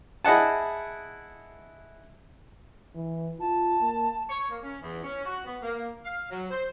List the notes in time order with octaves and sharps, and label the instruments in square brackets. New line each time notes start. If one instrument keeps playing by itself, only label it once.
[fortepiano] E4 G#4 D#5 F#5 A5
[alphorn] E3
[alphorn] F4 [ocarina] A5
[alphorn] A#3
[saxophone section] C#5
A#3
C#4
E2
C#4
F#4
B3
A#3
F5
F#3
C5